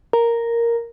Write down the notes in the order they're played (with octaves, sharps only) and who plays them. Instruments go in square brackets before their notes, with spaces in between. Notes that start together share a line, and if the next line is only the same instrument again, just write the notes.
[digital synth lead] A#4